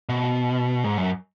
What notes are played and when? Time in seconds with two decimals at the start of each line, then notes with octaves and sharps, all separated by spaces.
0.09 B2
0.84 G#2
0.97 F#2